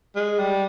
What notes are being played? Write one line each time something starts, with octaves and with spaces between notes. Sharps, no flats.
G#3
G3